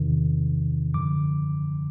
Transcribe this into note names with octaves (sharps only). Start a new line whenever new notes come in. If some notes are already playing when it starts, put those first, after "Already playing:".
Already playing: E2 C3 D#3
F#2 D3 F3 D6